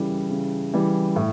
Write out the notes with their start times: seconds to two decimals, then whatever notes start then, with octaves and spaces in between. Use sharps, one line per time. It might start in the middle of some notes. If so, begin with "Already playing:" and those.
Already playing: C#3 E3 G3 A4
0.30 C#3
0.74 E3 G3
1.16 A2